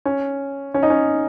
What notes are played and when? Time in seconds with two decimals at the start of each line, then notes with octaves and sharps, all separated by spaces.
0.05 C#4
0.74 C#4
0.83 D#4
0.90 C#4